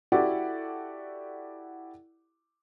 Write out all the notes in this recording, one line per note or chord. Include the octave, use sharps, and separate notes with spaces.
E4 F#4 G4 A4 D5 F#5